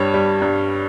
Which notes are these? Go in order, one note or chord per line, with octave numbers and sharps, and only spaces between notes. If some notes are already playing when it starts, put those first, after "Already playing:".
Already playing: G2 G3 C#5
G3
G2